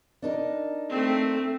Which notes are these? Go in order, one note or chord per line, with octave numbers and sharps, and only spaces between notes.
D4 D#4 A#4
A3 C4